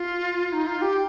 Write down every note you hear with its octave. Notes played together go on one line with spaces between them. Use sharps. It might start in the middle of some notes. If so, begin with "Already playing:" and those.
Already playing: F4
D#4
F4
G4